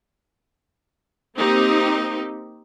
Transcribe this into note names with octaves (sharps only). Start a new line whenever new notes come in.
A#3 C4 D#4 G4